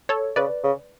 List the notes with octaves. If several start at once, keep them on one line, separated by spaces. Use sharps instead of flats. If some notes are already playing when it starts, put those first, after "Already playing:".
A4 C#5
C#3 B4 D5
C#3